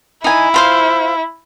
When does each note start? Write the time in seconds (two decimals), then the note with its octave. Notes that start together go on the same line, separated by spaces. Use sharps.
0.24 D#4 E4 G#5
0.54 F4 C5 F5